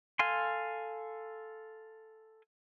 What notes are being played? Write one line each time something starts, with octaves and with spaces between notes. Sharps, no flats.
A4 F5 G#5 C6